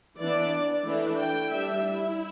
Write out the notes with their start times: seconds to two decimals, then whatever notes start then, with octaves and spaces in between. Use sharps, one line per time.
0.19 E3 B3 D4 D5
0.86 E3 A3 D4
1.19 G5
1.52 G3 D4 E5
1.86 E4